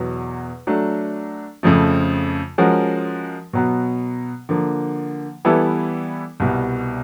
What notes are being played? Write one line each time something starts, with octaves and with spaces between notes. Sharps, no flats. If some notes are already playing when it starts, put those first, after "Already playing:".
Already playing: E2 B2 F#3
F#3 A3 D4
F2 C#3 F3 A3
F3 G#3 C#4 F#4 A#4
B2 F#3 B3
D3 F3 A#3
E3 G3 B3 E4 A4
C2 B2 G3